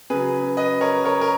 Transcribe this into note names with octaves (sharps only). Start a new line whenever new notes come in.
C#3 F#3 G#4 B4
B4 D#5
A#4 C#5
A#4 C#5
A#4